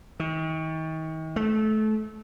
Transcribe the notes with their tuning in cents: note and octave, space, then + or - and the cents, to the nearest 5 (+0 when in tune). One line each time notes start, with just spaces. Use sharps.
D#3 +40
A3 -25